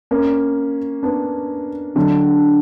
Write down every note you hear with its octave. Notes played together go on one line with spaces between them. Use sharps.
A#3 C#4
B3 D4
D3 F#3